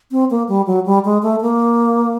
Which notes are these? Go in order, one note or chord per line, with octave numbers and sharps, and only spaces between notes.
C4
A#3
G3
F#3
G3
G#3
A3
A#3